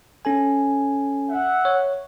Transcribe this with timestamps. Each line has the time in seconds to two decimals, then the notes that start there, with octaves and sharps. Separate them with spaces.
0.25 C#4 A4 G#5
1.30 E5 F#5
1.65 C#5